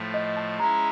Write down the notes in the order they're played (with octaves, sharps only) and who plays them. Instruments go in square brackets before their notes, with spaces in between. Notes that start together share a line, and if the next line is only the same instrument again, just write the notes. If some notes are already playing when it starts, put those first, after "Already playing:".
Already playing: [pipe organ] A2 F3 A3
[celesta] D#5
A5
[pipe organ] G#3 C#4 E4 [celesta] A#5